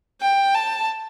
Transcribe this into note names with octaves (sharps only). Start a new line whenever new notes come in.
G5
A5